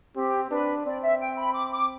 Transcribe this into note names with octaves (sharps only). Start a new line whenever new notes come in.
C4 G4
D4 B4
C4 D5
E5
G5
B5
D6
D6